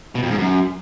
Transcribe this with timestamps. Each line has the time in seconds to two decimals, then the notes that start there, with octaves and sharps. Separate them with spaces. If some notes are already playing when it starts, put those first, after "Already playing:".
0.15 B2
0.23 F2
0.31 G#2
0.38 F#2